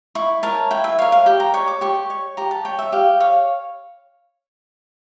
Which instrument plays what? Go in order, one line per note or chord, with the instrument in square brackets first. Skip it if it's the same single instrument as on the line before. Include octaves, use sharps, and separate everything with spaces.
[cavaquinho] E4 C#6
A#4 C#5 A5
E4 G5
E5
A#4 C#5 F5
F5
G4 G5
A#5
C#5 C#6
D6
G4 C#6
C#5
G4 A#5
A5
C#5 G5
E5
G4 F5
C#5 F5